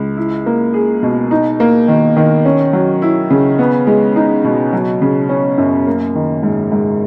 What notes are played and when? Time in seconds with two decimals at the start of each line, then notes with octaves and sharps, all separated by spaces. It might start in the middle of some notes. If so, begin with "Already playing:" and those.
Already playing: C#2
0.17 E4
0.46 A#3
0.74 G#4
1.03 B2
1.31 D#4
1.60 A#3
1.88 D#3
2.16 D#3
2.45 C#4
2.73 F#3
3.02 E4
3.30 C#3
3.59 B3
3.87 G#3
4.16 D#4
4.44 B2
4.73 F#3
5.02 C#3
5.29 C#4
5.58 F#2
5.87 A#3
6.15 D#3
6.43 G#2
6.72 G#2